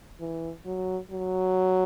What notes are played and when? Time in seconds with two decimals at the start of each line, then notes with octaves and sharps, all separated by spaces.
0.20 E3
0.66 F#3
1.11 F#3